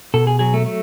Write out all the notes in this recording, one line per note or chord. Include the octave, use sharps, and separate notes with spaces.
B2 A4
G#4
F#3 G#4
A3
A3